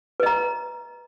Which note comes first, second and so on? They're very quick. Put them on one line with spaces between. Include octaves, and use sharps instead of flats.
B4 D#5 A#5